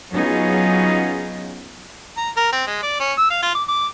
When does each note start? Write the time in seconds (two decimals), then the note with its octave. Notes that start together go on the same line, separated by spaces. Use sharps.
0.12 F#3 B3 C#4 D#4 F4 G#4
2.17 A#5
2.37 A#4
2.52 C4
2.67 G#3
2.83 D5
3.00 C#4
3.18 E6
3.31 F5
3.43 F4
3.55 D6
3.68 D6